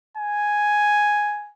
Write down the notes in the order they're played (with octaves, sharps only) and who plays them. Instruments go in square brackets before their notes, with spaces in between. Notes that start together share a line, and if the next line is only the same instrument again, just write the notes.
[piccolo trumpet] G#5